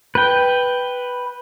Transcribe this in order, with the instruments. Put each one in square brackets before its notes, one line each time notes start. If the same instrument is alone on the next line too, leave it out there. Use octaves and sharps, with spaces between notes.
[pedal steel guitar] B4 G5